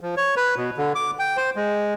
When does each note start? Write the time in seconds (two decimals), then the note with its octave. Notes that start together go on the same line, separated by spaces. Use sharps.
0.01 F3
0.17 C#5
0.37 B4
0.57 B2
0.77 D3
0.95 D6
1.19 G5
1.37 C5
1.56 G#3